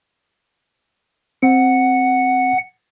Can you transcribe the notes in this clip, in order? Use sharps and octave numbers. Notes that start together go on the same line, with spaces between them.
C4 F#5